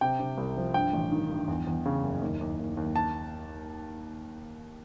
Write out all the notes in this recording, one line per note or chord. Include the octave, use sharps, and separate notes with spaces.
C3 G5
C3
C2
F3
G2 G5
A1
D#3
G2
E2
E2
C#3
F#1
D#2
D#2
D#2
D#2
A5